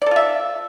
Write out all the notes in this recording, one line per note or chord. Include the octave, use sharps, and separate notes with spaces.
F4 A4 D5 E5